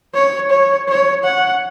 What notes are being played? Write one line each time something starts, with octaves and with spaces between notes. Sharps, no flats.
C#5
C#5
C#5
F#5